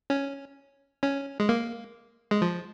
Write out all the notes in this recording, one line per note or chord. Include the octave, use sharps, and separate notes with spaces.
C#4
C#4
G#3
A#3
G#3
F3